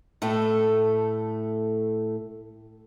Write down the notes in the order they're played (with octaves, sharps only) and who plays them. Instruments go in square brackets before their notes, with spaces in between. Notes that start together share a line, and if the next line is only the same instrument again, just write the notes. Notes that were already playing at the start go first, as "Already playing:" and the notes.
[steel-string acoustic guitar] A2 A3 A4